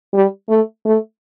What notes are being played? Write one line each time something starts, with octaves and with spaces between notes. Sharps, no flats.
G3
A3
A3